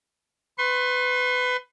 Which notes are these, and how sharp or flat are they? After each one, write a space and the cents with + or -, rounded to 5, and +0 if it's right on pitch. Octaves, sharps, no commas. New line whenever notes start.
B4 +20 C6 +40